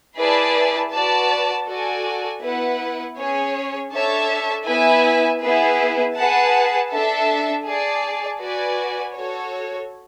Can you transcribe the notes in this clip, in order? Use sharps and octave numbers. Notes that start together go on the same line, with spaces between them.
E4 G#4 B4 D5 A5
F#4 B4 D5 A5
F#4 A4 D5 G#5
B3 E4 B4 F#5
C#4 G#4 C#5
D4 A4 C#5 E5 A5
B3 E4 B4 E5 G#5
B3 E4 G#4 B4
G#4 B4 F#5 A5
D4 A4 E5 A5
G#4 D5 A5
F#4 B4 D5 G#5
F#4 A4 C#5